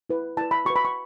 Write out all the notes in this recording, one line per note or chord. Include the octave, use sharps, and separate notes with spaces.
E4 B4
E4 B4 A5
B5
F#4 B4 C#6
B5
C#6